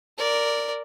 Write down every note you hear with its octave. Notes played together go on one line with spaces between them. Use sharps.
A#4 D5